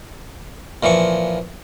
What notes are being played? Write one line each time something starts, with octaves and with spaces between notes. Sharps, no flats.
A#2 E3 F3 C#6